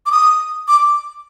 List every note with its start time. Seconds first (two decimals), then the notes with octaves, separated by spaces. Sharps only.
0.06 D6
0.12 D#6
0.68 D6